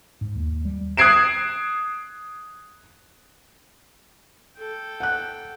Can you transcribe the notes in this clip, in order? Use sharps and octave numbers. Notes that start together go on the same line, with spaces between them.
G#2
D#2
G3
D#6 F#6 G#6 C7 D7 E7
A4 G5
F#5 F#6